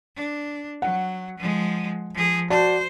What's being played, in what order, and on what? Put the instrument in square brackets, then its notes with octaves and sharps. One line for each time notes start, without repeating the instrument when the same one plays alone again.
[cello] D4
[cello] F#3 [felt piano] F#5
[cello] F3 G#3
F3 G#4
[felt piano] F#4 D5 A5 [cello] C5